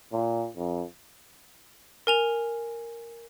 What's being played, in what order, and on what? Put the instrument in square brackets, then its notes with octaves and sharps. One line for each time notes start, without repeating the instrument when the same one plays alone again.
[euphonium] A#2
F2
[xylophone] A#4 G#5 F7